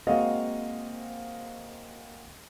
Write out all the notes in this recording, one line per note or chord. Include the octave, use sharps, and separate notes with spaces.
G#3 A#3 C4 F#4 D#5 F5